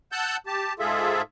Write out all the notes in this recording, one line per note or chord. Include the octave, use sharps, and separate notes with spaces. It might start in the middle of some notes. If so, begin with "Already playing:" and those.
F#5 A5 E6 F#6 G6
G4 A5
G#2 F4 G#4 A4 E5